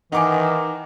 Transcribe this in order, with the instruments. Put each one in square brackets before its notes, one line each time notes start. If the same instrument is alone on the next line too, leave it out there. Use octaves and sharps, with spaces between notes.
[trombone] D#3 [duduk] E3 [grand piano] D#4 D6 [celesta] F#5 G#5